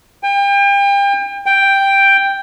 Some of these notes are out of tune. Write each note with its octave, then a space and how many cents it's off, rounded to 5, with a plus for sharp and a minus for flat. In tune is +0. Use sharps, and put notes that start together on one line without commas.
G5 +35
G5 +5